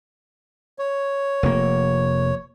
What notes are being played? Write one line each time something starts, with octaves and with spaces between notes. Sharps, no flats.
C#5
F1 A#3